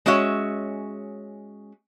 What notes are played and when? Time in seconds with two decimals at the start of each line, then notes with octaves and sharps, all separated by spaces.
0.06 G#3 C#4 F#4 C#5 E5